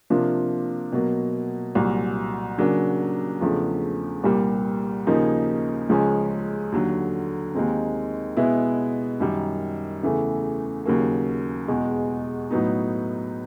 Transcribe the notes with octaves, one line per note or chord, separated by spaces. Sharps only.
C3 F3 A#3 D4 F4
B2 F#3 A#3
C2 A#2 F#3
C#3 F#3 A#3 D4
E2 C#3 F3 A3 D4
C2 A#2 G3 A#3
D#2 C#3 F3 A#3 D#4
C#2 C#3 F3 G#3 C#4
D#2 D3 F#3
D#2 D#3 G#3 C4
B2 G#3 B3 E4
F#2 D#3 G3
E2 C#3 E3 A3
D#2 C#3 F#3 A#3
E2 B2 G#3
A2 F#3 B3 D#4